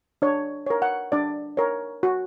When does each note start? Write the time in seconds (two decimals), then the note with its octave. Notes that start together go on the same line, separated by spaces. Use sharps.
0.22 D4 C#5
0.66 A#4 C#5
0.82 F#5
1.12 D4 D5
1.57 A#4 C#5
2.03 F#4